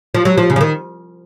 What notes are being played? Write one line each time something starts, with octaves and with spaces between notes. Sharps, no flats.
F3
F#3
F3
C#3
F3
D#3